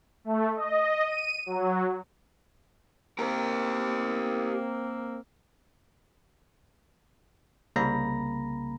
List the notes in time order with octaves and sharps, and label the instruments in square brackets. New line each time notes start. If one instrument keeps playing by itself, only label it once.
[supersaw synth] A3
D#5
D#7
F#3
[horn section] A#3 C4 [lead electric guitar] G4 A#4
[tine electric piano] C2 C#3 A#3 A#5 B5 A#6